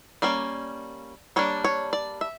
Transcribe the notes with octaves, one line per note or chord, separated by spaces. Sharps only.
G3 A#3 C#4 D5
G3 A#3 D4 C#5
C#5
D5
E5